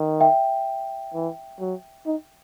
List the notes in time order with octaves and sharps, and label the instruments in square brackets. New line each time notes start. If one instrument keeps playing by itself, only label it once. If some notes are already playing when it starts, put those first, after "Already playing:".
Already playing: [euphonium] D#3
[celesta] E5 G5
[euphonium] E3
F#3
D#4